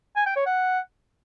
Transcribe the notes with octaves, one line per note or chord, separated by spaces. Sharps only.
G#5
G5
C#5
F#5